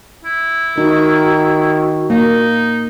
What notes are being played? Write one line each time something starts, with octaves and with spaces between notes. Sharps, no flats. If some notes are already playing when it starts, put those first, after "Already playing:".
E4
D#3 D#4 F#4
A#3 D#4